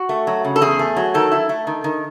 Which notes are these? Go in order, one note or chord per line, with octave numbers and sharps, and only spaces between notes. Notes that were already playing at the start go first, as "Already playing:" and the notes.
Already playing: F#4
A3
F#3
C#3
A4
E2 G#4
A3
F#3
D#3 A4
E4
A3
D#3
D#3